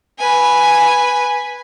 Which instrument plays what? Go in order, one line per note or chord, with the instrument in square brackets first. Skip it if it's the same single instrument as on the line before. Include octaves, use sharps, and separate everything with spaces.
[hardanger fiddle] B4 G#5